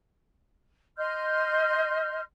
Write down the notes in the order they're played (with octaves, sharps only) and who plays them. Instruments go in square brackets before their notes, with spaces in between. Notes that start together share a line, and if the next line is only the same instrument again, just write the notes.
[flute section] D#5 C6 F6 G6